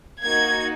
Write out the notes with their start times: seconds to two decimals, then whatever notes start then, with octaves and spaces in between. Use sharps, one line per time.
0.22 A#3 D#4 F#4 G#6